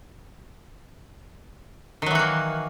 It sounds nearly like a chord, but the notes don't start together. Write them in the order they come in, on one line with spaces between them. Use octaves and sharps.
D#3 F#3 E3 F#4 A#3